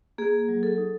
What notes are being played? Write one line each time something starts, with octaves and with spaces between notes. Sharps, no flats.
A#3 G#4
F#3
A4
D#4